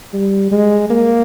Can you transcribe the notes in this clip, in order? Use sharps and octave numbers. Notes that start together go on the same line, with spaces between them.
G3
G#3
A#3